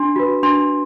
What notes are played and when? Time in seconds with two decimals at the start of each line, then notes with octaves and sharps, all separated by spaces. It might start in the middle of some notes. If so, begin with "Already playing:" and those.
Already playing: D4 C6
0.16 F#4 B4
0.43 D4 C6